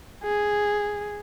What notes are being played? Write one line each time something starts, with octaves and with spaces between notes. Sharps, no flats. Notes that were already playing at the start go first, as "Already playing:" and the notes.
G#4